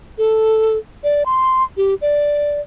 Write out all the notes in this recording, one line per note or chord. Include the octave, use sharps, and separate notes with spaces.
A4
D5
C6
G4
D5